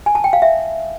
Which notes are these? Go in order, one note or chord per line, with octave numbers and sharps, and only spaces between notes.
G#5
A5
G5
F5
E5